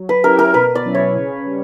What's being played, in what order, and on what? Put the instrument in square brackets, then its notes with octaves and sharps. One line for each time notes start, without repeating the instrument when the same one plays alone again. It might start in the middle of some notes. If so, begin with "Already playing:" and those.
Already playing: [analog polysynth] F#3
[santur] B4
[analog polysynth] C#4 E4 G4 [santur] A#4
[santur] A#4
[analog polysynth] B2 [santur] B4
[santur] D5
[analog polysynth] F#3 C#4 E4
[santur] C#5
[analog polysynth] C#3
G3